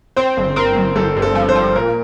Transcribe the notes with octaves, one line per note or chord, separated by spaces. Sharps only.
C4 C5
G1
C4 A#4
G1
G1 A4
G2
A4
F3
C5
F3
A#2 A#4